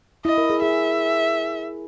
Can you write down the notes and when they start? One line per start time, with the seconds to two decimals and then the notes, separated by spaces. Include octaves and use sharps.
0.25 E4 D#5
0.38 A#4
0.50 G#4
0.62 G#4 E5